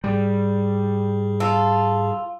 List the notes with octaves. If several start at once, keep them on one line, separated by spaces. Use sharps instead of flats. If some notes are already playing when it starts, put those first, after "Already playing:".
G#2 G3 G#4
F4 A4